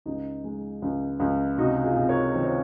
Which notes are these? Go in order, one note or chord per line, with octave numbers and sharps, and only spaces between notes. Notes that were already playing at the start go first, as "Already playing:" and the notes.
C#2 D#4
G#3
C#2
C#2
C3 D#4 F#4
F4 G#4
C3
A#4 C#5
D#3 C5
C#5